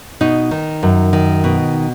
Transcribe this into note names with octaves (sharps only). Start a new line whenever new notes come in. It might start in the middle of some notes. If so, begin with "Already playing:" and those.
B2 D#4
D#3
F#2
D#3
B2